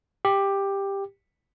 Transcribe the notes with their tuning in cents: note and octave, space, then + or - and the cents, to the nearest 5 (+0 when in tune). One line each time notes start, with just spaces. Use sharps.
G4 +10